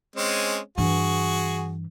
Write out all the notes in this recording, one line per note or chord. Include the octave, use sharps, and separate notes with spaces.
G#3 C4 C#4
G2 E3 F#4 G#4